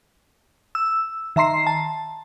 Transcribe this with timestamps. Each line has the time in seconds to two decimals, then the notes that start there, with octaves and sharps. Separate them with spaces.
0.75 E6
1.36 D#3 E5 A#5 C6 C7
1.67 A5